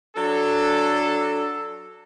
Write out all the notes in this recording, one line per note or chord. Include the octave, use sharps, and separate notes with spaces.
F#3 D4 A4